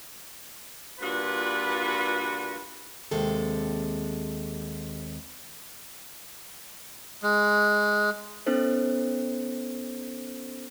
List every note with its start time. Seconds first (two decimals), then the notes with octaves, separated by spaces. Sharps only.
1.00 G2 A#2 F4 F#4 B4
3.11 D#2 C3 G#3 A4
7.23 G#3
8.46 B3 C#4 D#4 A4 C5